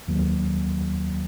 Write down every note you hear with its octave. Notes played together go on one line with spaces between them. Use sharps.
D#2 D#3 F#3 A#3